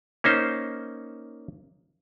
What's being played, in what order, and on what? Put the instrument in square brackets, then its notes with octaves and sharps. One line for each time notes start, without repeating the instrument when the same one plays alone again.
[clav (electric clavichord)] A#3 C#4 D#4 C5